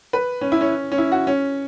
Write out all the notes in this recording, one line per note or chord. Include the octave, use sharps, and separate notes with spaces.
B4
C#4
E4
C#4
C#4
E4
F#4
C#4